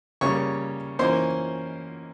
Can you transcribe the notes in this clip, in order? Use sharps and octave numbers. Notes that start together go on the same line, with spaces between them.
C#3 G3 A#3 C#5 C#6
E3 A#3 C#4 C5 C6